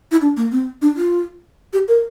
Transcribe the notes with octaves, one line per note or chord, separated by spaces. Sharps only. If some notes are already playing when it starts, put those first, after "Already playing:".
E4
D4
A#3
C4
D4
F4
G4
A#4